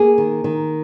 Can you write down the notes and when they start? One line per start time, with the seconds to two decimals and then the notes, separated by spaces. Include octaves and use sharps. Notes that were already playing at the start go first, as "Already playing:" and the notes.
Already playing: A#3 G#4
0.18 D#3
0.44 D#3